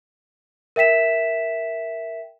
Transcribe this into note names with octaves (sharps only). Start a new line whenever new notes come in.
A#4 E5 G5 B6 E7